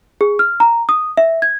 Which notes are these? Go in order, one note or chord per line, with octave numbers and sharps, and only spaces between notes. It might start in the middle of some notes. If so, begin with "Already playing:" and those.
G#4
F6
A#5
D#6
E5
G#6